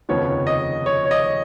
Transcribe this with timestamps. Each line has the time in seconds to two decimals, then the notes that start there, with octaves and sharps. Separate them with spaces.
0.09 F1 D#2 C#3 F3 B3 C#5
0.47 D#5
0.86 C#5
1.05 C#5
1.11 D#5